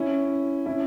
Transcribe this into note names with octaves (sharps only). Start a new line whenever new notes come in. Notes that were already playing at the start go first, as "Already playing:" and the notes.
Already playing: C#4 E4
C#4 E4